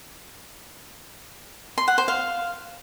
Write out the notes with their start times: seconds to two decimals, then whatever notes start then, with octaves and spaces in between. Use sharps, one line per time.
1.78 C6
1.88 F#5
1.98 C5
2.08 F5